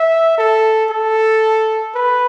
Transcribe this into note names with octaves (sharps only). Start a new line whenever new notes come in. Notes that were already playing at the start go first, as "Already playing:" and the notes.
Already playing: E5
A4
A4
B4